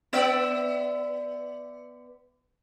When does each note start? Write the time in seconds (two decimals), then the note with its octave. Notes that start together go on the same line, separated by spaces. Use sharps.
0.13 B3 D5 E5